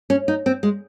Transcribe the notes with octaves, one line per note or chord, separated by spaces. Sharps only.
C#4
D#4
C4
G#3